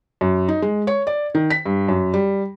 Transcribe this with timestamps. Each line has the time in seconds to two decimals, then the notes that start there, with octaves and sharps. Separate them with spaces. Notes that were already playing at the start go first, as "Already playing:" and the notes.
0.21 F#2
0.48 D#4
0.62 G#3
0.87 C#5
1.07 D5
1.35 D#3
1.50 B6
1.66 G2
1.88 F#2
2.14 G3